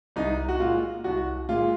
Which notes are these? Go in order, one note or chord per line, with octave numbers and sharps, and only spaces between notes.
C2 D#4
F#4
A#2 G#3 F4
C2 F#4
A#2 G#3 F4